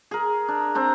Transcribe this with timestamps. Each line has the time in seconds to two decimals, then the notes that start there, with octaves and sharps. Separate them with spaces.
0.11 G#4 A#4
0.48 D4
0.75 C4 D4 A#5